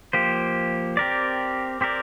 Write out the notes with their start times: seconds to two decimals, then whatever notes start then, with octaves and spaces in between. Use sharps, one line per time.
0.13 F3 A#3 G4 C5
0.97 C4 G4 A#4 D5
1.81 C4 G4 A#4 D5